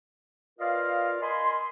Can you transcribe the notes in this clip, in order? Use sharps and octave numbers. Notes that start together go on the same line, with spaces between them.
F4 A#4 B4 D5 D#5 F5
A#4 D#5 G#5 B5 C6